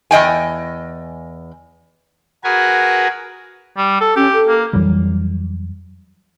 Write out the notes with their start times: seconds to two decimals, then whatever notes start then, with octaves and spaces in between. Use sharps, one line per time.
0.11 E2 D#5 G5 G#5
2.44 F#4 G#4 A#4 B4 G#5
3.78 G3
4.01 A4
4.17 C#4 G4
4.33 A4
4.48 A#3
4.73 F2 E3 F#3 G3